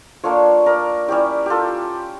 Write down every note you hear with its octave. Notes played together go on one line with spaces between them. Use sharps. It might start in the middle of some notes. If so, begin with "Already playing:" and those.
A#3 D4 F4 A4 C#5
A#4 D5
G3 C#4 E4 G4
F4 G4 A4